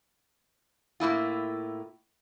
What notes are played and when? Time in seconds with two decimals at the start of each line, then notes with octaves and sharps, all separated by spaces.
1.00 A2 A#3 E4 F4